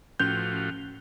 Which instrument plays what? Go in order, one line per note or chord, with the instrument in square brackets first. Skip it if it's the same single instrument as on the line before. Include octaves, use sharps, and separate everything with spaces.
[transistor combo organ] A2 F3 F#4 [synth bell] C#4 F7 G7 [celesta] G6